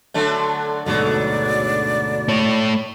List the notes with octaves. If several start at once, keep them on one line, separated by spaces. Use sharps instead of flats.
D3 F#3 A3
D2 G#2 B2 D3 F#3 D5
A3 C#5